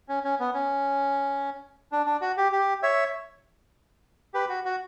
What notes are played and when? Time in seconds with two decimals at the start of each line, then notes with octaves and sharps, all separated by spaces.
0.09 C#4
0.24 C#4
0.40 B3
0.54 C#4
1.92 D4
2.06 D4
2.21 F#4
2.38 G4
2.52 G4
2.83 C#5 E5
4.34 G4 B4
4.49 F#4
4.65 F#4